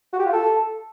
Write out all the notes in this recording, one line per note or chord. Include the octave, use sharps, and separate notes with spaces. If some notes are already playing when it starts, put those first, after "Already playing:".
F#4
G4
F4
A4